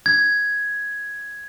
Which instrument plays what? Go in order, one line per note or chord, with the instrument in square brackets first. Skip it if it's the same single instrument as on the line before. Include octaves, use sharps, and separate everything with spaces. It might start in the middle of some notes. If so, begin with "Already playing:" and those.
[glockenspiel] G#6